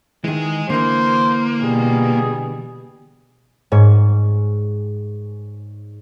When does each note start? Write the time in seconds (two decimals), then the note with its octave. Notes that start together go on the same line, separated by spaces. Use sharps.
0.24 D#3 E3 G#3 G#4
0.70 D3 E3 A#3 C5
1.61 B2 G3 G#4
3.72 G#2 C#5